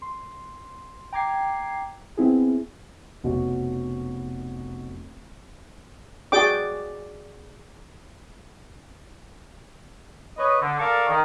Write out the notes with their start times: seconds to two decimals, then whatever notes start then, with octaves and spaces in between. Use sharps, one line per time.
0.02 C6
1.13 G5 A#5 D6 G#6 C7
2.17 B3 C4 E4 G#4
3.23 F1 B2 C#4 F#4
6.32 F#4 G#4 D5 G5 D6
10.38 B4 C#5 D#5
10.62 D3
10.79 A4 A#4 D5 F5 A5 C#6
11.09 D#3